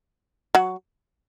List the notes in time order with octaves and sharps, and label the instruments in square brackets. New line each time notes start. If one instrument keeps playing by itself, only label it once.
[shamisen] F#3 F#4